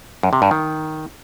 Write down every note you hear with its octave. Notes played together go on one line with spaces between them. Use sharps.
F#2
C3
G2
D#3